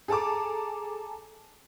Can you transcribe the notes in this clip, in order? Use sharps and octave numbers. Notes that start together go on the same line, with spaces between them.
G#4 A4 A5 A#5 D6